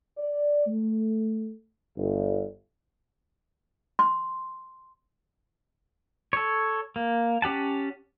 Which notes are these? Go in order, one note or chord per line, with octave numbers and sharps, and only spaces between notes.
D5
A3
G1
C6
A4 C#5
A#3
C#4 G4 F#5 A5